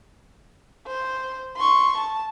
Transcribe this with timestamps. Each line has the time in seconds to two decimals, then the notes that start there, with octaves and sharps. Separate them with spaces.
0.87 C5
1.57 C6 C#6
1.98 A5